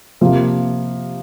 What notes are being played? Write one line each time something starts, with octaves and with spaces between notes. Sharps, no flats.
C3 F3 A#3